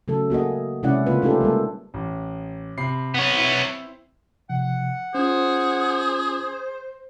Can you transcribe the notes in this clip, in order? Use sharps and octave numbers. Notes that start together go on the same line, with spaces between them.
C#3 F#3 A3 A4
A#3 F#4 G#4 D#5
C3 G#3 C#4 E4 D5 F#5
C#3 A3 A#3 F4 B4
A3 C#4 D#4 F4 G4 A4
G3 G#3 A#3 A4
A1
C3 B5 C7
B3 C#5
C4 E4
C3 F3 F#5
C#4 F4 G#4 C5